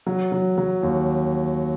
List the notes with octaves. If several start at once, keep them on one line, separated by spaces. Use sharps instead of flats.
F#3
F#3
F#3
D#2